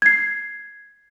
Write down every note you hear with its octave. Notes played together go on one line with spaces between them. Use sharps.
G#6 C7